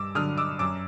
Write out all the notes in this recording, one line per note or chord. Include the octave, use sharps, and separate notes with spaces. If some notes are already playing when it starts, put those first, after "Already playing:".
Already playing: G2 D6 E6
D3 F#3 D#6 F6
D6 E6
F#2 D6 E6